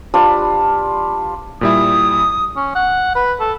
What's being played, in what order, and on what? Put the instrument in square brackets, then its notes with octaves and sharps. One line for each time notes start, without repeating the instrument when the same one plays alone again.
[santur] G3 D4 F4 B4
[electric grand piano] A#2 G3 E4 [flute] D#6
[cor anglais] C#4
F#5
B4
A4